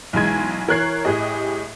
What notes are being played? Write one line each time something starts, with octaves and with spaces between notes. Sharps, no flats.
B1 E3 G#3 G#6
E3 A#4 C#5 F#6 G#6 C7
A2 G4 G#4 D#5